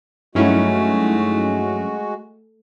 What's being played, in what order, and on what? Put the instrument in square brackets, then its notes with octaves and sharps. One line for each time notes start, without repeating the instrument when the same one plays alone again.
[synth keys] G2 F#3 C#4 [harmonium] G#3 F#4 [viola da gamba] A3 [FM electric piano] D#4 E4